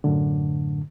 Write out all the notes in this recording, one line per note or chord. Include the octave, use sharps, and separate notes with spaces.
F#2 A2 D3